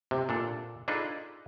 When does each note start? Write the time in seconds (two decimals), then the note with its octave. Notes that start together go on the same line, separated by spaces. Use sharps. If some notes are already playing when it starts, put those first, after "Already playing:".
0.11 C3
0.29 A#2 D4 A4
0.88 D4 D#4 F4 G#4 A4 B4